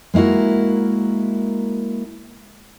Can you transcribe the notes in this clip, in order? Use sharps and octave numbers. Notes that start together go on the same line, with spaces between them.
G#3 A#3 E4 F#4 A#4